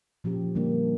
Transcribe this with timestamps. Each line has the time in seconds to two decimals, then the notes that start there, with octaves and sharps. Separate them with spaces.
0.24 A#2 F3 C#4 G4
0.55 D3 G3 A#3 D4